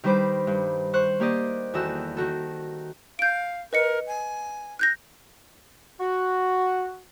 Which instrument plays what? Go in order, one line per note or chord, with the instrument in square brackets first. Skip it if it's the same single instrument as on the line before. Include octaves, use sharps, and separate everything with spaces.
[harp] D#3 G3 D4 B4 C5 D6
G2
C5 C#6 F#6
A#3 G4 D5 D#5
E2 D#3 F#4 A4 E6
D#3 F#4 A4
[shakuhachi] F5 [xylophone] G6 D7
[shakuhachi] A#4 [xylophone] B4 D#5 C#7
[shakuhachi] G#5
[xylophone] F#6 G6 A#6
[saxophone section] F#4